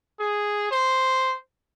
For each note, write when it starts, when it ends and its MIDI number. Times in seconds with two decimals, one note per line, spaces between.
0.20 0.70 68
0.71 1.35 72